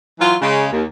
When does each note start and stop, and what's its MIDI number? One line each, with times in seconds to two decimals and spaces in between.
0.19 0.35 52
0.19 0.35 54
0.19 0.35 65
0.41 0.67 49
0.41 0.67 56
0.71 0.83 39